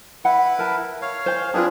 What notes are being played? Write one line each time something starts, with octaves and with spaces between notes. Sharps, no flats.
E4 B4 F#5
A#4 A5
C#5 F5
C5 G#5
C4 D4 F4 G#4 B4 A5